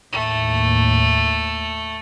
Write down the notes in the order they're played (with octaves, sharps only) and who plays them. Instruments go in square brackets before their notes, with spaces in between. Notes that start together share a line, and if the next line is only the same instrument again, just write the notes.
[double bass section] D#2 A2 [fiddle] A3